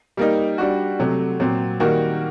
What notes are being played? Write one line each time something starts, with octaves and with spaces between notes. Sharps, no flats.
G3 A#3 D#4
G3 D4 F#4
C3 F#3 A3
A#2 F#3 C4
D#3 G3 A#3 F#4